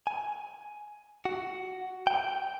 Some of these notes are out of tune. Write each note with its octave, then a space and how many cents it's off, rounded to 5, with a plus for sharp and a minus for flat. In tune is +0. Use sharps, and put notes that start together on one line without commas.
G#5 +10
F#4 +10
G5 -10